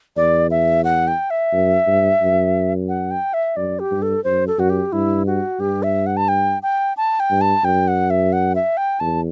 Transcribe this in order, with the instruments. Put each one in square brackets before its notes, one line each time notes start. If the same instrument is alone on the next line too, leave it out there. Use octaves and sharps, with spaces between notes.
[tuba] E2 [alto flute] D5
[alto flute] E5
F#5
G5
E5
[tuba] F#2
G2
F#2
[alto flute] F#5
G5
E5
[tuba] F#2 [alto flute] D5
[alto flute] G4
[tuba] G2
[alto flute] A4
[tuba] F#2 [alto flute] C5
[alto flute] A4
[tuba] F#2 [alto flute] F#4
[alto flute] G4
[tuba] G2 [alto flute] E4
[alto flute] F#4
[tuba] G2 [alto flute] G4
[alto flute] E5
F#5
A5
G5
G5
A5
G5
[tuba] G2
[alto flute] A5
[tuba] F#2 [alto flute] G5
[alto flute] F#5
E5
F#5
E5
G5
[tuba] E2 [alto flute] A5